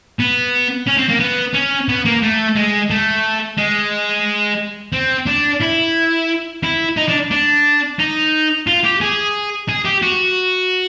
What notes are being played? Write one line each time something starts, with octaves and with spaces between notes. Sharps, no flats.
B3
C#4
C4
A#3
B3
C#4
B3
A#3
A3
G#3
A3
G#3
C4
D4
E4
E4
D#4
D4
D4
D#4
F4
G4
G#4
G#4
G4
F#4